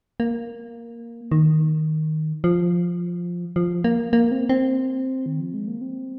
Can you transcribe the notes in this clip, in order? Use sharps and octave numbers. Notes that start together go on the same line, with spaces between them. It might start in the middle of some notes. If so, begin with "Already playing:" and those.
A#3
D#3
F3
F3
A#3
A#3
C4
C4
D#3
F3
G#3
A#3
C4